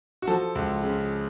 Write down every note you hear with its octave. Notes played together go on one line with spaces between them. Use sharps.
F#4
F3 A4
C#2
C#3